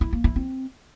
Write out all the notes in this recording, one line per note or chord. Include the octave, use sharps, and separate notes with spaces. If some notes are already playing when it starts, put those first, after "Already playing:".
E4
A#3
E4
C4